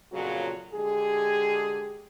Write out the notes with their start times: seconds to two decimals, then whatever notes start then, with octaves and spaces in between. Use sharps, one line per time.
0.12 F2 A#2 C#3 F#3 F#4
0.73 D3 G#3 G4 G#4